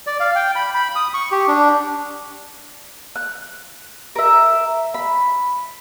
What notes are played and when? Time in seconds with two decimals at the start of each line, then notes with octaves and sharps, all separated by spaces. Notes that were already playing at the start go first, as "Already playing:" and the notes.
0.07 D5
0.20 F5
0.36 G5
0.56 B5
0.75 B5
0.96 D#6
1.14 C#6
1.32 G4
1.48 D4
3.16 F#6
4.15 A#4 E5
4.94 B5